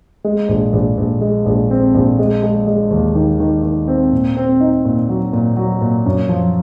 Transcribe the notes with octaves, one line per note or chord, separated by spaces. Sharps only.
G#3
A#1
A#1
A#1
G#3
A#1
C4
A#1
G#3
G#3
G#3
D#2
D#3
D#3
D#3
C4
A#2
C4
D#4
A#2
F#3
A#2
F#3
A#2
F#2
F3